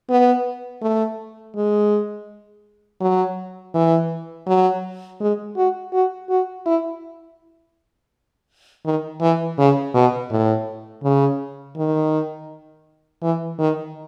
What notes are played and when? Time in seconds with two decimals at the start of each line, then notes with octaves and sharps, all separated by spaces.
0.10 B3
0.82 A3
1.56 G#3
3.01 F#3
3.74 E3
4.47 F#3
5.21 G#3
5.57 F#4
5.93 F#4
6.30 F#4
6.66 E4
8.85 D#3
9.21 E3
9.58 C#3
9.94 B2
10.31 A2
11.03 C#3
11.77 D#3
13.22 E3
13.59 D#3